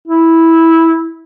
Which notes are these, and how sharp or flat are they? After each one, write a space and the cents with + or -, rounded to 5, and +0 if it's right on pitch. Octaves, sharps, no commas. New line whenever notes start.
E4 -10